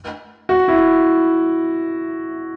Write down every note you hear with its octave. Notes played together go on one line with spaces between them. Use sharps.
F#4
E4